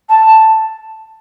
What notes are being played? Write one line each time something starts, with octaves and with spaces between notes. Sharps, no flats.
A5